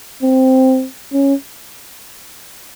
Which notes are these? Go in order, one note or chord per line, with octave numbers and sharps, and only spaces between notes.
C4
C#4